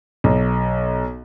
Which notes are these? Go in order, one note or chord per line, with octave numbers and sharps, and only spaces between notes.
B1